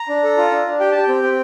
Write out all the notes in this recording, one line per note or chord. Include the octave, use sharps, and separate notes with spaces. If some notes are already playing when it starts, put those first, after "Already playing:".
Already playing: A#5
D4
A4
F4
D4
D4
G4 G5
G4 A5
G5
C4
C4